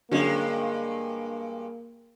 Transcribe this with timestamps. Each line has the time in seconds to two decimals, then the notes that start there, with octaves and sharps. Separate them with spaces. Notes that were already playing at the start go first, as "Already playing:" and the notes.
0.11 G2 D3 F#3 G#3 A#3 C#4